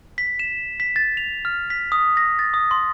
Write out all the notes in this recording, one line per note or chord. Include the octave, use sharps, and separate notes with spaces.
B6
E7
B6
A6
F7
F6
B6
D#6
A#6
A6
D#6
C6